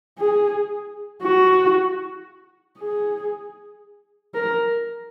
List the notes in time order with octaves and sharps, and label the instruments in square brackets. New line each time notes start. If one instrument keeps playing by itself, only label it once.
[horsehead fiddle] G#4
F#4
G#4
A#4